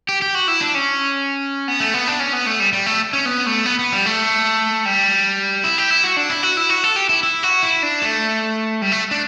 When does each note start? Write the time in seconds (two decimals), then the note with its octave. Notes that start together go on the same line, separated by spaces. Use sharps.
0.09 G4
0.22 G4
0.35 F#4
0.48 E4
0.61 D4
0.75 C#4
1.68 B3
1.80 A3
1.94 B3
2.08 D4
2.20 C#4
2.33 B3
2.46 A3
2.60 G3
2.73 G3
2.86 A3
3.13 C#4
3.26 B3
3.46 A3
3.65 B3
3.79 B3
3.92 G3
4.06 A3
4.85 G3
5.64 E4
5.78 G4
5.91 E4
6.04 F#4
6.17 D4
6.30 E4
6.43 F#4
6.57 E4
6.70 F#4
6.84 A4
6.96 G4
7.09 E4
7.23 E4
7.43 F#4
7.63 E4
7.83 D4
8.02 A3
8.82 G3
8.92 A3
9.11 D4